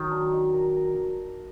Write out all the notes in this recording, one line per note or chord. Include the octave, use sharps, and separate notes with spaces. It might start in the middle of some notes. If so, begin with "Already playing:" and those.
Already playing: D#3 F#3
D4
D#4
A#4
A#4